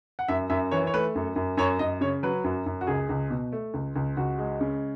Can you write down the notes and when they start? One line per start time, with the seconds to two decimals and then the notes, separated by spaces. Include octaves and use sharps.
0.19 F#5
0.28 F#2 E5
0.50 F#2 E5
0.71 E3 C#5
0.87 C#5
0.93 A3 B4
1.15 F#2
1.36 F#2
1.57 F#2 C#5
1.79 F#2 D#5
2.01 C#3 C#5
2.23 F#3 B4
2.44 F#2
2.66 F#2
2.81 F#4
2.87 C#2 G#4
3.09 C#2
3.30 B2
3.52 A3
3.74 C#2
3.96 C#2
4.17 C#2 F#4
4.39 G#3
4.61 C#3